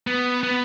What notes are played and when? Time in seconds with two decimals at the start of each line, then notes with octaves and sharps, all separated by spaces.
0.07 B3
0.43 B3